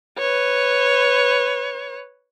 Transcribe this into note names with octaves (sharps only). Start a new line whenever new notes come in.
B4 C#5